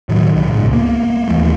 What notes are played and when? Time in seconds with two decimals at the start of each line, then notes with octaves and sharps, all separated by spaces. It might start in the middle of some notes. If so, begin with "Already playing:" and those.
0.09 A2 D#3 F#3
0.35 C#2 A#2
0.52 C#2 G#2
0.73 A#3 B3
1.28 D#2 E3 F3 A3